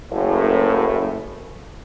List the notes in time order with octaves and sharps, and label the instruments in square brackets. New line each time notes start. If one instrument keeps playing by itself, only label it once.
[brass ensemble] F#1 A2